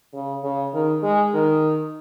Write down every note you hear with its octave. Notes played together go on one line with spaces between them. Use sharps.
C#3
C#3
D#3
G#3
D#3